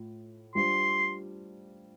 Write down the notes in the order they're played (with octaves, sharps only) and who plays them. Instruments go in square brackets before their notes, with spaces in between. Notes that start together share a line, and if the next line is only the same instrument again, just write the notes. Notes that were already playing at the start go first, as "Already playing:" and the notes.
Already playing: [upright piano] A2 F4
[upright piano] G3 D4 F4 C5 [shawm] C6